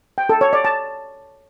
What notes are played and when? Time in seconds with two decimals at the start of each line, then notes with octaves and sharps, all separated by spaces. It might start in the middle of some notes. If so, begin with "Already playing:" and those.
0.18 G5
0.29 A4
0.41 C#5
0.53 D5
0.65 A5